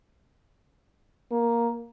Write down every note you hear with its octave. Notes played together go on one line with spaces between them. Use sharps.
A#3